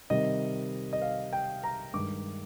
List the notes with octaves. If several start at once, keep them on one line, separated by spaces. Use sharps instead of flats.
C3 D#3 G3 D#5
D#5
F5
G5
A#5
G2 D#3 G#3 D6